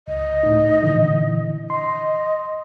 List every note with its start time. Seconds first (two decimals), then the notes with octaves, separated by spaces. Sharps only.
0.08 C#2 D#5
0.43 A2 D#4
0.82 A#2 D3 E3
1.70 D#5 C6